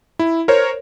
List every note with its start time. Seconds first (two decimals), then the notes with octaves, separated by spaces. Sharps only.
0.19 E4
0.48 A#4 C5 C#5